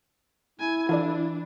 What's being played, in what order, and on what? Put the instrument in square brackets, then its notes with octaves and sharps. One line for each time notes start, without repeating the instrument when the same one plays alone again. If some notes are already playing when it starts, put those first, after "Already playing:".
[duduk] E4 [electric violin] G#5
[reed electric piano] E3 [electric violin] D4 [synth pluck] F4 A4 D5